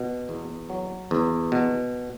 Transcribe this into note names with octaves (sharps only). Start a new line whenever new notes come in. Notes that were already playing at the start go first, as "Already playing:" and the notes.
Already playing: B2
E2
F#3
E2
B2